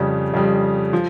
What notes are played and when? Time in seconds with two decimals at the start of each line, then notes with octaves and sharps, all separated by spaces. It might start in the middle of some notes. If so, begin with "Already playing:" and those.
Already playing: F2 C#3 G3
0.33 F2 C#3 G3
0.93 F3